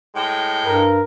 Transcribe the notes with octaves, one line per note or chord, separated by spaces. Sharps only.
A2 G#3 G5
G2 A#4